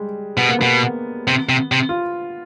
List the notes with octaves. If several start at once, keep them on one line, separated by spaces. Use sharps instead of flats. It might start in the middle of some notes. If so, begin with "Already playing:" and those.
Already playing: G3 G#3
B2 B3
A#3
B2 B3
C3
C3
C3
F4